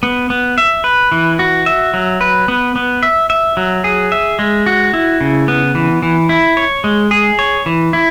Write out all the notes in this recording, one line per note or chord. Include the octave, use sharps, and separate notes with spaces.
B3
B3
E5
B4
E3
F#4
E5
F#3
B4
B3
B3
E5
E5
F#3
G#4
E5
G#3
F#4
E4
C#3
B3
E3
E3
E4
C#5
G#3
G#4
C#5
E3
E4